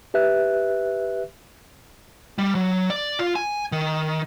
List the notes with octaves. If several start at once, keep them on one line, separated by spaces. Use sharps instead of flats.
G4 B4 E5 F#6
G3
F#3
D5
F4
G#5
D#3